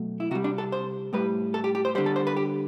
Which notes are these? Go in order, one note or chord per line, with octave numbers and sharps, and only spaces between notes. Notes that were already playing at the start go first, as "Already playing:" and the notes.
Already playing: B2 F#3 A3
E4
C3 G3 F#4
D4
A4
C5
A2 G3 B4
A4
G4
G4
C5
D3 G3 C5
A4
C5
B4
G4